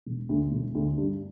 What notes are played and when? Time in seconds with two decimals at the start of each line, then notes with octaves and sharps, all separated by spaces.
0.06 E1
0.29 D2 D3
0.52 E1
0.75 D2 D3
0.98 G2